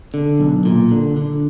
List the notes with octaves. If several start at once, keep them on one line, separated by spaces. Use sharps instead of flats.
D3
B1
A#2
D3
D3